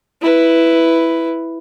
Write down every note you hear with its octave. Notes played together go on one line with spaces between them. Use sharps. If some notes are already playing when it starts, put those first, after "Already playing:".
E4 B4